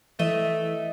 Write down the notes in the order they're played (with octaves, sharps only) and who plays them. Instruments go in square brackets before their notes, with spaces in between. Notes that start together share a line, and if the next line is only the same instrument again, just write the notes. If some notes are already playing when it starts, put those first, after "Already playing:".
[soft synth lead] E3 [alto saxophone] A3 [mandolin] D#5 [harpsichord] E5